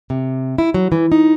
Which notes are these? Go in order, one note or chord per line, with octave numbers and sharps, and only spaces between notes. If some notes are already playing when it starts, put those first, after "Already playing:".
C3
E4
F#3
E3
D#4